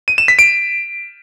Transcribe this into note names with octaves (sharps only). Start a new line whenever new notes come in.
D#7
E7
B6
D7